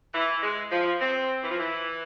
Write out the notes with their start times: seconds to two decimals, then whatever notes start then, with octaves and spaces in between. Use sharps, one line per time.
0.14 E3
0.42 G#3
0.72 F3
1.01 C4
1.43 E3
1.51 F3
1.59 E3